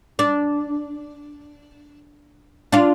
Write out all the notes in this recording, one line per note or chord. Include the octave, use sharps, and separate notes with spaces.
D4
D4 F4